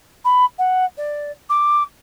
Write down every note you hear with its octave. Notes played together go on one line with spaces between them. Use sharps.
B5
F#5
D5
D6